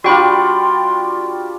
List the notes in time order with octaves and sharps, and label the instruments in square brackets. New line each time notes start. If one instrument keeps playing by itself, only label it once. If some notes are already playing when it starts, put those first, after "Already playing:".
[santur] G3 D4 F4 [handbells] F#4 G5 B5 [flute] C6